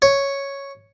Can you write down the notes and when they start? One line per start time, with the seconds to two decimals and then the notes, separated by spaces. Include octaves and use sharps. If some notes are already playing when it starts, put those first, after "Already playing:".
0.02 C#5